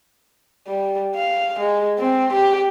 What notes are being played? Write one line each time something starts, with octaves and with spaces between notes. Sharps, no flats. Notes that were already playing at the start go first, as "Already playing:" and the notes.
G3
F5
G#3
C4
G4